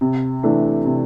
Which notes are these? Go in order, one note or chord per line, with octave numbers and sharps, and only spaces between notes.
C3
E3 A3 D4
C3